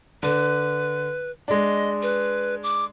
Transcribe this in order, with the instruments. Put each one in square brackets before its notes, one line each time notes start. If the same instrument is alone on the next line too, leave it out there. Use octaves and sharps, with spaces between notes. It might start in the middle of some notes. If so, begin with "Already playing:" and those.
[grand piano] D3 [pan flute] B4
[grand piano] G#3 D4 [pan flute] D#5
[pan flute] B4
D6